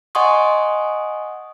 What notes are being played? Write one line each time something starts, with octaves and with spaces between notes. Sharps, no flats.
D#5 F#5 G#5 C6 C#6 D#6